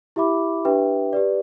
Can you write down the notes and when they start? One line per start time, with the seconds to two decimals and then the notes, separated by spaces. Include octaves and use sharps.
0.16 E4 G4 E5 B5 D6
0.65 D4 G4 B4 E5 G5
1.13 G4 B4 D5